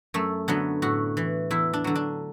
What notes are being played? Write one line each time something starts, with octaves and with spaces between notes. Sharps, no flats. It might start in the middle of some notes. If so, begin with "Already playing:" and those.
F#2 A3
D3 F#3 B3
A2 F#4
E3
E2 E4
D4
D3 F#3
D4